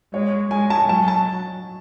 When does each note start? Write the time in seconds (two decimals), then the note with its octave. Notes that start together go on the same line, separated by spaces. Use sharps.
0.13 G#3 C#5
0.51 G#3 G#5
0.70 A5
0.88 F#3 A5
1.08 A5